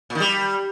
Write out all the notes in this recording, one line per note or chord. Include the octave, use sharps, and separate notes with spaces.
A#2
D#3
G3